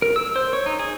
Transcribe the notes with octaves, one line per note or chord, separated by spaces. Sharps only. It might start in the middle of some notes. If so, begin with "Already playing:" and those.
A#4
E6
C5
C#5
D#4
G#4